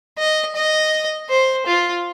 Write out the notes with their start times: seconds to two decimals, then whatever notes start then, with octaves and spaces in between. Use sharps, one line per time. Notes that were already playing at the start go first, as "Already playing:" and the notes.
0.18 D#5
0.55 D#5
1.29 C5
1.66 F4